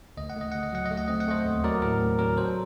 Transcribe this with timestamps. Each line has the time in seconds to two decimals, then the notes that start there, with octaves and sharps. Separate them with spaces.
0.17 D2 D#5
0.30 F#5
0.36 A3 D#5
0.52 D2 F#5
0.63 D#5
0.73 F#3 F#5
0.86 D#5
0.91 A3
0.97 F#5
1.08 C4 D#5
1.20 F#5
1.28 A3 C5 D#5
1.45 D#2
1.64 F#3 A#4 D5
1.82 A2 A#4
2.01 C4
2.19 F#3 A#4
2.37 F#3 A4 C5